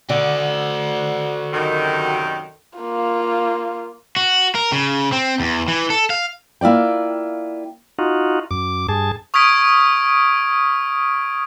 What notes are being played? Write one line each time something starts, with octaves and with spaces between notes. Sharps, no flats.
D3 F#4 D5
F#2 C3 D#3
A#3 F4
F#4
A#4
C#3
C4
E2
E3
A4
F5
A#3 E4 F4 D5 G5
D#4 F4 F#4
F#2 D6
G2 G#4 A5
C#6 D#6 F6 G#6 B6 D7